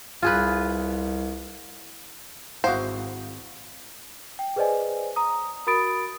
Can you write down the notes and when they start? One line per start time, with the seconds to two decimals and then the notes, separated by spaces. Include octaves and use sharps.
0.22 C2 F4 G#4 B4
2.64 G#1 E4 F#4 C5 F5 F#5 D#6
4.39 G5
4.56 G#4 B4 C5 D5 D#5 G#5
5.16 A#5 D#6
5.67 F#4 A#4 B5 D#6 A6 D7